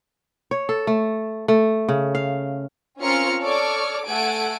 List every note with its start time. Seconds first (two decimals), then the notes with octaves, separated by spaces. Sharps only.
0.51 C#5
0.69 A4
0.87 A3
1.48 A3
1.89 C#3
2.15 F5
3.00 C4 C#4 F4 A#4 F6 C#7
3.40 A4 C#5 D5 C#6 D6 F6
4.07 A3 A4 F#5 G#5 D7